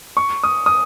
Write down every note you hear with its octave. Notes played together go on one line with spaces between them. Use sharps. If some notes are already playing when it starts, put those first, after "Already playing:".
C#6
D#6
D#6